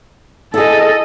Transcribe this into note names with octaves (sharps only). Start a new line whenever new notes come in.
E4 G#4 A4 D#5